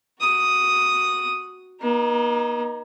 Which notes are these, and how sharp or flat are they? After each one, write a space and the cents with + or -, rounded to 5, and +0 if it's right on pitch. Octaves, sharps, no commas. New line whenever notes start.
F#4 +0 D#6 +0
A#3 +45 D#4 +0